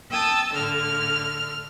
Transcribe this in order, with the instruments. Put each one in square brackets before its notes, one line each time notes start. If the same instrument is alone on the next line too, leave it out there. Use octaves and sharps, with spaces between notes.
[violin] G5 D#6 [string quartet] A5 E6
[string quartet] A2 D3 [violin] F6